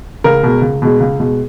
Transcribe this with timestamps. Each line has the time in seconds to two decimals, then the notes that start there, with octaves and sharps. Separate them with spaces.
0.24 C#2 A#4
0.43 B2 G#3
0.62 C#2
0.82 B2 G#3
1.00 C#2
1.20 B2 G#3